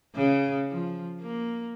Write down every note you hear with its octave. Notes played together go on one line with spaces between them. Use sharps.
C#3
F3
A#3